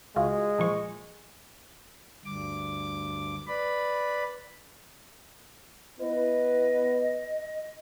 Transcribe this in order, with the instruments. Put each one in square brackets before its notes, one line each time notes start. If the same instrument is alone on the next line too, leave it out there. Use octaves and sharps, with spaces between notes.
[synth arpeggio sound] C#2 F4 F#4 [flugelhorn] G#3
[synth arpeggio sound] A#2 F3 C#6
[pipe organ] D2 G2 D6
B4 D5 B5
[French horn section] B3 E4 B4 [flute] D#5